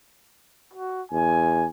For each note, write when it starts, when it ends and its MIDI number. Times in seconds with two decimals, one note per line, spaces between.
0.73 1.02 66
1.12 1.66 40
1.12 1.67 80